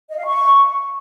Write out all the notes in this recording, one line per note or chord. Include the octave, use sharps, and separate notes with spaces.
D#5
F5
C#6